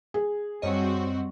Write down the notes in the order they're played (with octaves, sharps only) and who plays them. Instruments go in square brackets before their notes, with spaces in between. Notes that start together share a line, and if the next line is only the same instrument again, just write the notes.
[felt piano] G#4
[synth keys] F#2 C#5 D#5 [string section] G3 C4 F#4